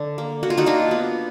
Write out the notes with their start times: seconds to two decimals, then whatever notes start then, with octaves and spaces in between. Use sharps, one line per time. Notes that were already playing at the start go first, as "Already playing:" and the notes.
Already playing: D3
0.18 A#3
0.43 A#3 F#4
0.50 F4
0.57 D#4 F#4
0.66 A#3 D4 F4
0.91 B3